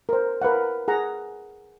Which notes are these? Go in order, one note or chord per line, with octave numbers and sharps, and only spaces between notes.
A#4 C5
A#4 B4 F5 F#5
G#4 F#5 A#5